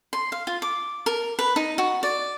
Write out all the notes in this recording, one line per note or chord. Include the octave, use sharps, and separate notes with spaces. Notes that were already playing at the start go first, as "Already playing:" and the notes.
C6
F5
F4
D6
A#4
B4
D#4
F#4
D5